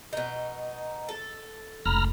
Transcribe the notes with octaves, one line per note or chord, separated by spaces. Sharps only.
B2 D#4
A4
F1 C#2 A#5 B5 F6